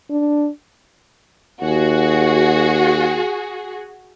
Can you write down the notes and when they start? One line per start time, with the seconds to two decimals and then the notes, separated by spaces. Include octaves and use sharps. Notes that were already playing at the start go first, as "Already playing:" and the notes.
0.10 D4
1.62 D#2 F#4 G#4